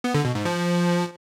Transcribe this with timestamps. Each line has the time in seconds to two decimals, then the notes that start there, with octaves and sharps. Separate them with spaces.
0.04 B3
0.15 D3
0.25 B2
0.35 G#2
0.45 F3